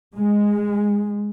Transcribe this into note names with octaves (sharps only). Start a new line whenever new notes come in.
G#3